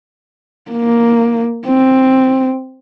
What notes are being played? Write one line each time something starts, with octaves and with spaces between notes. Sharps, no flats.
A#3
C4